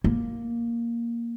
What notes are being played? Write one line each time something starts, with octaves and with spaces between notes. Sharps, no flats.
A#3